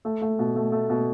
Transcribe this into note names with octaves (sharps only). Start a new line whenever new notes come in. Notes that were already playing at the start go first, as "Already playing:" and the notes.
A3
A3
B2
A3
A3
B2